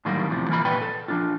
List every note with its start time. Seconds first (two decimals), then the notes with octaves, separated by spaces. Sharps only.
0.05 A2 D#3 F#3 G3 A#3
0.28 E2 A2 C3 F3
0.49 E3 F3 A#3 A#4 B5
0.65 A#2 G3 B3 B4 G5 B5
0.81 A4
1.08 F3 D4 F4